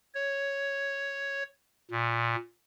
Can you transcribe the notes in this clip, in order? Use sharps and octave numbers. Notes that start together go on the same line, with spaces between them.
C#5
A#2